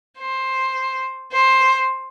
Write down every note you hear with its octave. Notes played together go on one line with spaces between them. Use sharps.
C5
C5